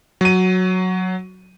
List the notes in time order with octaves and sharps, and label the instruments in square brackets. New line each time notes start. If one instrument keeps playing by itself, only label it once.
[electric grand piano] F#3 D#7